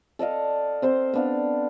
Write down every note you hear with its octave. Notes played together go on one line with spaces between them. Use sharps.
A4 D5 D#5 F5
C4 C5 C6
B3 D4 F5